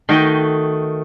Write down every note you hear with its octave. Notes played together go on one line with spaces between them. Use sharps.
D#3 A3 F#4 D#5 G5